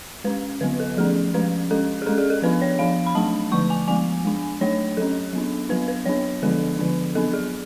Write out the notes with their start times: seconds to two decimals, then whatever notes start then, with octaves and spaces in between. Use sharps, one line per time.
0.24 G#3 C#4 B4
0.61 D3 F#3 B3 B4
0.80 A4
0.97 F3 A3 C#4 G#4
1.34 F3 G#3 C#4 B4
1.71 G#3 C#4 A4
2.02 G#4
2.06 G#3 C#4 A4
2.18 G#4
2.30 A4
2.42 F3 B3 D4 B4
2.62 C#5
2.79 F3 B3 D4 F5
3.06 B5
3.15 F#3 A3 D4 A5
3.51 D3 F3 A3 C#6
3.70 G#5
3.88 F3 G#3 B3 G#5
4.25 G#3 D4
4.61 F#3 A3 D4 C#5
4.97 F#3 C#4 A4
5.33 F#3 B3 D4
5.69 F#3 B3 D4 B4
5.88 B4
6.06 F#3 B3 D4 C#5
6.42 D3 F3 G#3 B3 D4 A4
6.79 D3 F3 B3 D4
7.15 F#3 B3 D4 A4
7.33 G#4